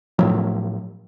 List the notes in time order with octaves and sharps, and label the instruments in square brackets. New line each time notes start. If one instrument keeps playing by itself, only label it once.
[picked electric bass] A2 F3 F#3